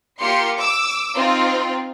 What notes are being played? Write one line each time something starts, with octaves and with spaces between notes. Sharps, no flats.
A#3 F4 G4 C6 C#7
D6 E6
C4 D#4 F4